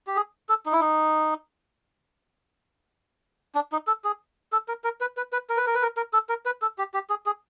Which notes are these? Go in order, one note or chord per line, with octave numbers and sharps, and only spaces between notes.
G4
G#4
A4
D#4
E4
D#4
D4
D#4
A4
G#4
A4
A#4
A#4
B4
B4
B4
A#4
B4
A#4
B4
A#4
A#4
A4
A#4
B4
A4
G4
G4
G#4
G#4